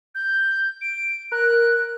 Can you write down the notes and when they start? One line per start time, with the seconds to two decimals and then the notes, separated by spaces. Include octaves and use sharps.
0.15 G6
0.81 D7
1.32 A#4 F#6